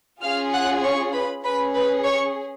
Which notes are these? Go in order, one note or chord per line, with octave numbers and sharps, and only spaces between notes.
C#4 F4 G#4 F5 F6
F#5 F#6
C#5 C#6
B4 B5
C#4 G#4 B4 B5
B4 B5
C#5 C#6